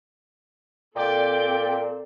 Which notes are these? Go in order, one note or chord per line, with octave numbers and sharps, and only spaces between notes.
A#2 C4 A4 D5 G5